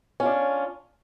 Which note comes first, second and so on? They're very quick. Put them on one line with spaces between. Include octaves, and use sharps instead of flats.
C#4 F4 D4